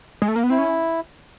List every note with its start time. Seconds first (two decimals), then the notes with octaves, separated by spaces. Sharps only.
0.22 G#3
0.28 A3
0.36 A#3
0.43 B3
0.50 C4 E4
0.58 C#4